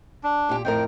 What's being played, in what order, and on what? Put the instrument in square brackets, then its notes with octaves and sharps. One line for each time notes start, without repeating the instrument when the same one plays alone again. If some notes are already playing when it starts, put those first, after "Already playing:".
[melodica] D4
[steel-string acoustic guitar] A#2 G4
[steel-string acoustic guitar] F2 A2 A#4 [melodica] G5